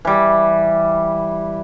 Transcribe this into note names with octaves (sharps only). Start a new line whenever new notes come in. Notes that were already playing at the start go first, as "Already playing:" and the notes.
E3 G3